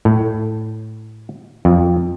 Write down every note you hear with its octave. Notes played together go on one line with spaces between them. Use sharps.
A2
F2